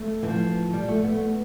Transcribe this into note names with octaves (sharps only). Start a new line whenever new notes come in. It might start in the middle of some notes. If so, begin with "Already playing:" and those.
Already playing: A3
E3
F3
G3
A3
B3